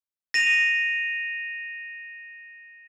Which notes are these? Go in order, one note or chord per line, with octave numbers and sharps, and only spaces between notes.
A#6 D#7 F7